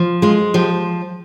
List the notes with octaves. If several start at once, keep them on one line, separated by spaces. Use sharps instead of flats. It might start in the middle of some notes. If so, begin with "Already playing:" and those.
Already playing: F3
G#3 F4
F3 G4